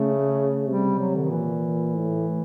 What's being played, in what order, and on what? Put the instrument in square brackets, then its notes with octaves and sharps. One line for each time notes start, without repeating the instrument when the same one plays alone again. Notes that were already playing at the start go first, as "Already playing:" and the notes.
Already playing: [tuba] C#3 [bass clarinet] A3
[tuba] C3 [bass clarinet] G3
[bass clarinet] F#3
D3
D#3
[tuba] A#2 [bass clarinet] E3
[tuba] A2